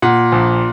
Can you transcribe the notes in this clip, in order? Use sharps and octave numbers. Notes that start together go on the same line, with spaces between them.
A#2 F#5
A#1